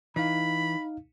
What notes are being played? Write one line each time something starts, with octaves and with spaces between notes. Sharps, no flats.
E3 D#4 F5 B5